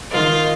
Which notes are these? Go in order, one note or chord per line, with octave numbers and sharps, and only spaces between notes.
D#3 F4